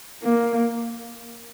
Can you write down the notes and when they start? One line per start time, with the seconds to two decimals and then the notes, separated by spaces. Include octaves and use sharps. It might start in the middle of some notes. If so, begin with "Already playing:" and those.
0.23 A#3